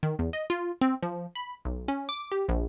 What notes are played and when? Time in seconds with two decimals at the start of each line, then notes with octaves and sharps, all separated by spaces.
0.03 D#3
0.19 E2
0.33 D#5
0.50 F4
0.81 C4
1.02 F3
1.35 B5
1.65 B1
1.88 C#4
2.09 D6
2.32 G4
2.49 A#1